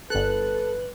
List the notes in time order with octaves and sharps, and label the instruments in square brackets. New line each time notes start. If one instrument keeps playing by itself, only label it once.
[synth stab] G1 F#6 [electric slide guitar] A4 [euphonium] B4